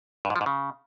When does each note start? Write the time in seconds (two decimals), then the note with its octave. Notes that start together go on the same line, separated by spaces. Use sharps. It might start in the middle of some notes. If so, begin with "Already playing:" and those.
0.25 G2
0.30 G#2
0.36 F3
0.41 G#2
0.46 C#3